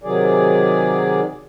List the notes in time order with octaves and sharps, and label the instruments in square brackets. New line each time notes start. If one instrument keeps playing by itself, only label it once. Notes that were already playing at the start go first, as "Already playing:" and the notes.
[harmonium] C3 D#3 F#3 G#4 D5